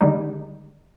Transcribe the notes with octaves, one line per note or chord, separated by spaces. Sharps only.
D3 D#3 G3 G#3 D#4